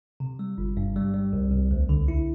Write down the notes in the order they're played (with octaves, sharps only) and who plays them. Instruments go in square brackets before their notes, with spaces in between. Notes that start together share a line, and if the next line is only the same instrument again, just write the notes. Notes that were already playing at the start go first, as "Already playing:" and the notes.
[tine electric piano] C3
G3
G1
G2
G3
G3
C2
C2
D2
D3
E4